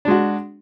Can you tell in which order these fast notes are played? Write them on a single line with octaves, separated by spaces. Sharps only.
D4 G#3 F#4